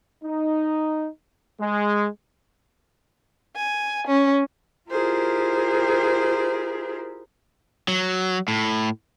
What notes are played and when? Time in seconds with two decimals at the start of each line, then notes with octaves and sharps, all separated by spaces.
0.24 D#4
1.60 G#3
3.56 G#5
4.08 C#4
4.89 E4 F4 G4 G#4 A#4 C5
7.88 F#3
8.48 A2